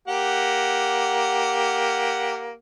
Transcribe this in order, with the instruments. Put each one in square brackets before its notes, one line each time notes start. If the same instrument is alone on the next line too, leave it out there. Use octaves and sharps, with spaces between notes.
[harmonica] A#3 G4 F#5